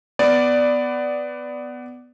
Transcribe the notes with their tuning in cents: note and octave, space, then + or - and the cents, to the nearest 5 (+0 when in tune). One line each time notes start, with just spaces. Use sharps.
B3 +10 D5 +0